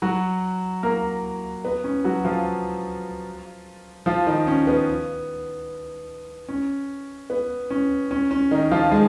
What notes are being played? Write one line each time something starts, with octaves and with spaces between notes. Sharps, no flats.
F#3 F#4
A#3 A#4
B3
C#4
F#3 F#4
F3 F4
F3 F4
D#3 D#4
C#4
B3
C#4
B3
C#4
C#4
C#4
D#3 D#4
F3 F4
G#3 G#4